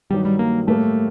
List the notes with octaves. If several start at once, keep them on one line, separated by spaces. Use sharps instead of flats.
G2 D#3 F#3 G3
G3
A#3
A2 G3 A3 A#3